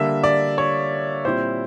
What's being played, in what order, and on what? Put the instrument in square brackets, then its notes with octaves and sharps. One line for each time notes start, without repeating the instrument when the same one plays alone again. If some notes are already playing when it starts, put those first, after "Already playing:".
Already playing: [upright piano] D3 G3 A#3 E5
D5
C#5
A#2 G3 C4 E4 C5